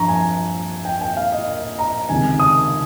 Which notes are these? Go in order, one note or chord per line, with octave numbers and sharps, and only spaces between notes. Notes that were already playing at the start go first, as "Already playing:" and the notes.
Already playing: G2 F3 A#5 C#6
G#5
G5
G5
F5
D#5
D#5
A#5
C#2 C3 D#3 G#5
D#6